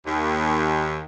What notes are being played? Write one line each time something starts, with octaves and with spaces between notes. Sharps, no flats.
D#2